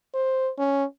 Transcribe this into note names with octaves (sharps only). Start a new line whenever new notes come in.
C5
C#4